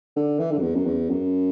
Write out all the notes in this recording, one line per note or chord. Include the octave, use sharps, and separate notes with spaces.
D3
E3
D3
F#2
E2
F#2
E2
F#2